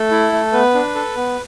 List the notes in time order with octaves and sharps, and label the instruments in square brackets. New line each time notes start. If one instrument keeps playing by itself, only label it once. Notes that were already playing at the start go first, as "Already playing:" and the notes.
Already playing: [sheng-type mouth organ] A3 A4
E4
A3
B3 B4
D4
A4
B3